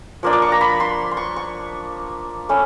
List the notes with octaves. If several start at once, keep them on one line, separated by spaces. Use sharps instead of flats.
F3 A#3 D4
D6
C#6
A#5
B5
C6
C6
C#6
C#6
A3 C#4 B5